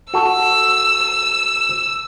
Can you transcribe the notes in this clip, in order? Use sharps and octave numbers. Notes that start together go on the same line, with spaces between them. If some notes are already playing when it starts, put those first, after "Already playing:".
F#4 A4 E6